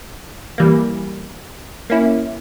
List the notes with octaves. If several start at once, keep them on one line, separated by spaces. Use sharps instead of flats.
E3 G3 A#3
A#3 C#4 E4